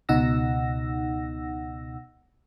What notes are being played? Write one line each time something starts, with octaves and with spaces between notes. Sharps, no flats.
C#2 B2 D#4 F#5 E6 A#6